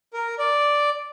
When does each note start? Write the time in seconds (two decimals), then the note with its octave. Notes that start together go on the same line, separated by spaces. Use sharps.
0.13 A#4
0.39 D5